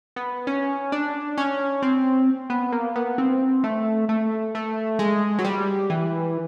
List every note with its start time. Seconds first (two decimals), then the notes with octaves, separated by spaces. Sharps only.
0.16 B3
0.47 C#4
0.92 D4
1.38 C#4
1.82 C4
2.50 B3
2.72 A#3
2.96 B3
3.18 C4
3.64 A3
4.09 A3
4.55 A3
4.99 G#3
5.39 F#3
5.44 G3
5.90 E3